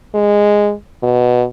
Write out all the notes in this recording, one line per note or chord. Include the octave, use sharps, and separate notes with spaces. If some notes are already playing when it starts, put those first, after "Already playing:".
G#3
B2